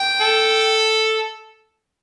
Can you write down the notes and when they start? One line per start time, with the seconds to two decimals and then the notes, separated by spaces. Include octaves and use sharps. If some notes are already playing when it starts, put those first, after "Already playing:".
Already playing: G5
0.21 A4